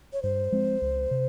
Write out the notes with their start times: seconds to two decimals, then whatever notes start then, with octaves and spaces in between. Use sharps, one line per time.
0.13 C#5
0.22 G2 C5
0.52 F3 G#3 C4
0.82 C#2
1.11 C3